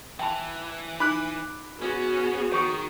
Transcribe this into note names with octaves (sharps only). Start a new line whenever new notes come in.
E3 G5 A5 B5
D#4 B5 D6 F#6
B3 C#4 F#4 G#4
D#3 C#5 C#6 D#6